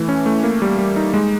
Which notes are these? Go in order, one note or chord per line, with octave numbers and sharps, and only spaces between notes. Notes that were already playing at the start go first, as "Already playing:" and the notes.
Already playing: E3 A3
C#4
A3
A#3
G3
G3
D#4
G#3